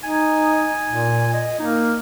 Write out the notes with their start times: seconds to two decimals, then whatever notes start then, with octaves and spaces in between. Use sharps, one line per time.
0.04 D#4 G#5
0.87 A#2
1.33 D#5
1.59 A#3 D#4